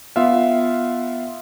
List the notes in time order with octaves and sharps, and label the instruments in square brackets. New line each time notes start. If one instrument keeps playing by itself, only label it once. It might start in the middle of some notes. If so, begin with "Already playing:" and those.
[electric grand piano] B3 F4 E5 F5